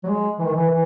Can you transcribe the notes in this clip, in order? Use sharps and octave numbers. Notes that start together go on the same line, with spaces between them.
F#3
G#3
E3
D#3
E3
E3